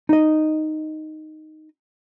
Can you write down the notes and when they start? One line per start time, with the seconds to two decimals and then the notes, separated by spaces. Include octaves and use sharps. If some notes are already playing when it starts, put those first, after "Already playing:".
0.09 D#4 D#5